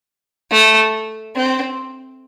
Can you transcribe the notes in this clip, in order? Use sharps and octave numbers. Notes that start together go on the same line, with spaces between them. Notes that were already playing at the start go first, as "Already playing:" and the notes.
A3
C4